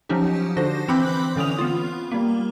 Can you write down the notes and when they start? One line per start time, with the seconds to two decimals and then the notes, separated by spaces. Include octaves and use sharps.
0.09 F3 F#3 C#4 D#4 G4
0.57 D3 D4 F#4 C5 A#6
0.88 E3 C4 B5 D6 F#6 G6
1.36 D3 E3 C#4 D#6 F7
1.59 B3 F4
2.11 G3 A#3